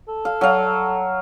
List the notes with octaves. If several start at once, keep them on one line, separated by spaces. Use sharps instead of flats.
A4
F5
F#3 F5